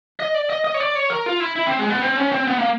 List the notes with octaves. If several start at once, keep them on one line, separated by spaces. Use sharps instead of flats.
D#5
D5
D#5
D#5
C#5
D5
C#5
A#4
F4
E4
E4
C4
G#3
B3
C4
C#4
C4
B3
A#3